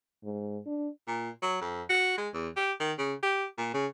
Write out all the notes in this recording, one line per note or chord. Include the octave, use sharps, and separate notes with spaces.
G#2
D4
A#2
F#3
F2
F#4
G#3
E2
G4
D#3
C#3
G4
A#2
C#3